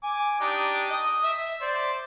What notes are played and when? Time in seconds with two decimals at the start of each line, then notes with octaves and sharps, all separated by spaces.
0.03 G#5 D6
0.41 D4 D#4 G4
0.90 D#5
1.24 E5
1.61 C5 D5